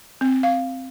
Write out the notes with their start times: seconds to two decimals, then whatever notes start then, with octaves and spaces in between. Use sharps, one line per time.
0.21 C4
0.43 F5